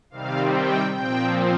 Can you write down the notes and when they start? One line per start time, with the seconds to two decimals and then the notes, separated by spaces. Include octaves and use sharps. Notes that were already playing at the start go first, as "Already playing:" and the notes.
0.10 C3 D#3 G3 C4 F5
0.53 G5
0.93 A#2 F3 C4 G5